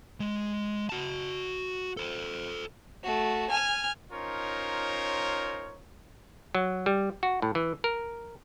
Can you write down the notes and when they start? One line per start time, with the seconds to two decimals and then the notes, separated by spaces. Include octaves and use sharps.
0.20 G#3
0.89 F#4 A5
1.97 A4 C5
3.03 A3 F#4
3.50 G#5 F6
4.12 C#4 D#4 F4 A#4 C5 C#5
6.55 F#3
6.86 G3
7.23 F#4
7.42 A2
7.55 E3
7.84 A#4